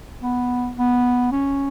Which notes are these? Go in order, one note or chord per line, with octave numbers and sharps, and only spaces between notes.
B3
B3
C#4